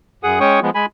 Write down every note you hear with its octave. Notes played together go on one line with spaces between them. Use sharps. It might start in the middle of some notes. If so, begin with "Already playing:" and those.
F#2 G#4 F#5 D#6
G#3 C#4 C#5 G5 C#6 D#6
F3 G#3 B3
G#3 G#5 B5